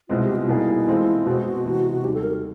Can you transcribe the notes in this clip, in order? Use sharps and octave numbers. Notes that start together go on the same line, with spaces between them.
C2 B2 G#3 C4 F4
G4
F4
B2 G3 A#3 D#4 E4 G#4
E3 G#3 C4 F4 A4
B2 G#3 C4 F#4
C3 E3 G#3
D#2 D#3 G3 G4
A4
A#4